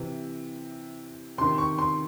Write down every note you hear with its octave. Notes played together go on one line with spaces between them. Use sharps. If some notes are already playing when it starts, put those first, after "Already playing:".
Already playing: C3 E3
C3 D#3 C6
C#6
C6